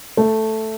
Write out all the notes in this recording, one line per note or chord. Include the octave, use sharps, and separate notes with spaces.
A3